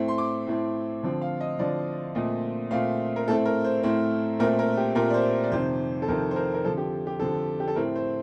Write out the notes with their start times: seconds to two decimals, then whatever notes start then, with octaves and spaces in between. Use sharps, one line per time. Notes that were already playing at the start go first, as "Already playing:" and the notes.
Already playing: A2 A3 C4
0.08 C6
0.18 D6
0.47 A2 A3 C4
1.03 D3 F3 C4
1.21 F5
1.41 D#5
1.58 D3 F3 C4 D5
2.15 A#2 A3 C4 D#5
2.71 A#2 A3 C4 F5
3.16 A#4
3.27 A2 A3 C4 A4
3.45 A#4
3.64 C5
3.83 A2 A3 C4 C5
4.40 A#2 A3 C4 A#4
4.59 A#4
4.77 G4
4.95 A#2 A3 C4 A#4
5.10 D5
5.14 C5
5.43 D5
5.52 F2 C3 D#3 C5
6.02 A4
6.08 F2 C3 D#3 A#4
6.31 C5
6.36 A#4
6.54 A#4
6.65 D3 F3 C4 A4
6.77 G4
7.07 G4
7.20 D3 F3 C4 A4
7.60 G4
7.68 A4
7.76 A2 A3 C4 A#4
7.96 C5